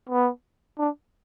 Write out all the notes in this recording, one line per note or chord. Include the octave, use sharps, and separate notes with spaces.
B3
D4